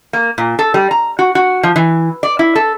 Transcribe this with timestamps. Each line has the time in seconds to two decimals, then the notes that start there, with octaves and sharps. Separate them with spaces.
0.13 A#3
0.38 A#2
0.59 A4
0.74 G3
0.91 A#5
1.19 F#4
1.35 F#4
1.63 F3
1.76 E3
2.23 D5
2.39 E4
2.56 A4